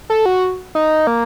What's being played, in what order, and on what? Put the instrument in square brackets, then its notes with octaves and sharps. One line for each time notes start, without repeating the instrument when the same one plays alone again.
[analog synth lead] A4
F#4
D#4
A#3